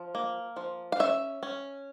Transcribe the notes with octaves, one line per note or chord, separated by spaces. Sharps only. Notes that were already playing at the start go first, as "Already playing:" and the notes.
Already playing: F3
A#3
F3
F5
C#4 E5
C#4